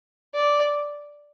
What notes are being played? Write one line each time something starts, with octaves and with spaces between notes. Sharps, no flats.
D5